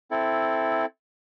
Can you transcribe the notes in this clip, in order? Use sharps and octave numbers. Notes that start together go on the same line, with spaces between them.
C4 E4 A4